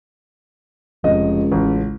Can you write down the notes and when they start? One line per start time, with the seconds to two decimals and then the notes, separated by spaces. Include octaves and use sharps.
1.04 F1 C#2 D#5
1.52 A1